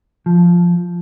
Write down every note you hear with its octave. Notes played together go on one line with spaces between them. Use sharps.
F3